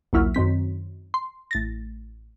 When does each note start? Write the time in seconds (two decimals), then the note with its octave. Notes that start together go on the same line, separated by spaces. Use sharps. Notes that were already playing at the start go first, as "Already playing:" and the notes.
0.13 A#1 D#2 F#3 E4 F6
0.34 F#2 D#3 C4 B6
1.14 C6
1.51 A1 A6 A#6